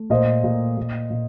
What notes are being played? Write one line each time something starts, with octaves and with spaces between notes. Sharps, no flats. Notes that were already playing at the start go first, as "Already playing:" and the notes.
Already playing: A3
A#2 C5 D#5
A#2
A#2
A#2